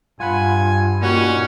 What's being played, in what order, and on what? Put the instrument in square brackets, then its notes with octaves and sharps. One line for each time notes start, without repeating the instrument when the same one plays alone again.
[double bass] G2 [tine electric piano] F4 F#5 B5 [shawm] G#5
[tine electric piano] A#2 [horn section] G3 D#4 F#4 [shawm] C#4